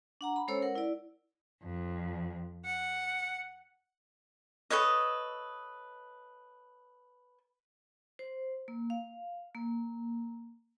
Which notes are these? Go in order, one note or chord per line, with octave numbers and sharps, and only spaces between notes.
D4 F#5 A#5
B5
G#3 C#4 A4 C5 C#5 E6
A#4 F#5
E4 D5
F2
F#5
A4 B4 C#5 D#5
C5
A#3
F5
A#3